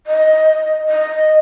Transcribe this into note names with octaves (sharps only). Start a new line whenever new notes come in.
D#5
D#5